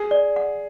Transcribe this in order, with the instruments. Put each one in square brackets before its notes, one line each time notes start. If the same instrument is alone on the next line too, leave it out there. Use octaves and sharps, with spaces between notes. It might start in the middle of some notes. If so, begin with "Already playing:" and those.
Already playing: [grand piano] G#4
[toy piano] D5
F#5